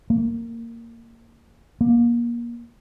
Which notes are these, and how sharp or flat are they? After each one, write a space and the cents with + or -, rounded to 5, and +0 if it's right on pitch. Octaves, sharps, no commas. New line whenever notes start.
A#3 -15
A#3 +25